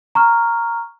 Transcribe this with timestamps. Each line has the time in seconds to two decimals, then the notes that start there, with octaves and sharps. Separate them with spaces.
0.15 A#5 C#6 F6